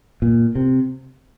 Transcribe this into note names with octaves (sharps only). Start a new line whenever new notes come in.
A#2
C3